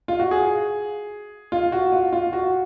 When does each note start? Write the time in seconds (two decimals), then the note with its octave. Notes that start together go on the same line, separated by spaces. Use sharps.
0.08 F4
0.20 F#4
0.31 G#4
1.52 F4
1.72 F#4
1.92 F4
2.13 F4
2.33 F#4